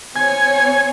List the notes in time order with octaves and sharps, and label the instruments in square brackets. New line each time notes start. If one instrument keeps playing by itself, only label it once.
[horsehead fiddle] C4 C#5 [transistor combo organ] G#5